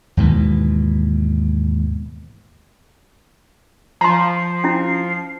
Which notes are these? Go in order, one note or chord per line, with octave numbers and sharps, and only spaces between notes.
D#2 G#2 B2 E3
F3 A#5 C6 C7
C#4 E4